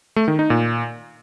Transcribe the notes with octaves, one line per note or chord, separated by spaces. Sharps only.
A3
D#3
D#4
A#2